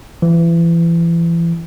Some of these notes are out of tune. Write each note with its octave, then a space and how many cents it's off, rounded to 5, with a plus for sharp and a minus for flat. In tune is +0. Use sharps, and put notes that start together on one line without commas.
E3 +30